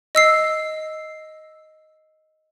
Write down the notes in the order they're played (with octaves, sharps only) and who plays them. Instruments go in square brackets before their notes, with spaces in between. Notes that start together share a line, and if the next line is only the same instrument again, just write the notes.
[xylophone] D#5 E6 C7